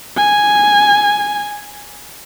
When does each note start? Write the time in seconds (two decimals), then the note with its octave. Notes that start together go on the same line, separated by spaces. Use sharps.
0.17 G#5